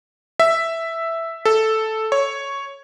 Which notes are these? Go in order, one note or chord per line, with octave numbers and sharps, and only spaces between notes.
E5
A4
C#5